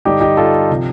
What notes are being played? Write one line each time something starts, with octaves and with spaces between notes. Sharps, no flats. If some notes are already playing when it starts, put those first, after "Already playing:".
G2 D3 G3 D#4 G4
D#4 G4
F4 A4
C3 F3